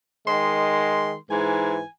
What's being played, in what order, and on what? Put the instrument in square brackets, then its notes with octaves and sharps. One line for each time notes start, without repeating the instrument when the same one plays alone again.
[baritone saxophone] D#3 [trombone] G#3 [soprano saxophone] C6
[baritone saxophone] G#2 [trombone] E3 [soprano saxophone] G#5